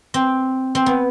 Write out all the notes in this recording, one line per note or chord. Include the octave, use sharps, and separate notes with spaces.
C4
C4
B3